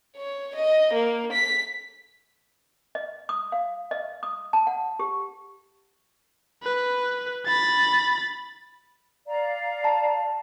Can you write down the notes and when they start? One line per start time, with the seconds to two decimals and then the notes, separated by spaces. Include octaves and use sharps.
0.16 C#5
0.56 D#5
0.93 A#3
1.32 B6
2.95 D#5
3.29 D#6
3.52 F5
3.91 D#5
4.23 D#6
4.53 A5
4.67 F#5
4.99 G4
6.63 B4
7.46 B5 A6
9.27 D5 F5 A#5
9.84 A5